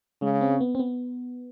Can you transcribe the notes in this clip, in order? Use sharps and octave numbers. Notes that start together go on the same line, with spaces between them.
C#3 G#3
C4
B3
C4
B3